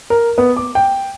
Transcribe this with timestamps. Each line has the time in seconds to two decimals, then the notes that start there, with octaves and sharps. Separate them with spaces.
0.10 A#4
0.38 B3
0.57 D6
0.75 G5